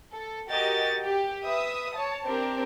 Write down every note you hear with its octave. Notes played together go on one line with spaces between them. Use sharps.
A4
F#4 G4 A#4 D#5 A6
G4
B4 E5 D#6
C#5 A5
C4 D4 G4 A#4